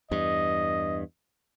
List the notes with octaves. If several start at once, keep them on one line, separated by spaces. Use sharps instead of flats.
E2 G2 D#5